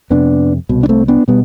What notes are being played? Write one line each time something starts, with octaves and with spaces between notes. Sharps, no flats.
F2 C3 B3 D4
C2 B2
D4
A3 C4
B3 D4
B2 G3 B3